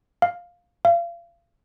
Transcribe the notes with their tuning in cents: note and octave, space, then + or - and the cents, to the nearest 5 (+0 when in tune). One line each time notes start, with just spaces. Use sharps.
F5 +10
F5 -35